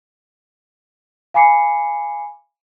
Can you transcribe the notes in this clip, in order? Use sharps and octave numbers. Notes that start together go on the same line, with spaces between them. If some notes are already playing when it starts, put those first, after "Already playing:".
F5 G#5 B5 D6 C7 C#7